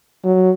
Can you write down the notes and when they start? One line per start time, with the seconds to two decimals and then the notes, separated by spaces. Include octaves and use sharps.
0.24 F#3